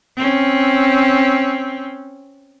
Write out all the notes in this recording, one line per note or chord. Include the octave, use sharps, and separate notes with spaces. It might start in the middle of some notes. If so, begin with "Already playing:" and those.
C4 C#4